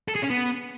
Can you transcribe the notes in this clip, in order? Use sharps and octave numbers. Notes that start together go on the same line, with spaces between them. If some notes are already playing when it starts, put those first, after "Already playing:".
A4
G#4
C#4
B3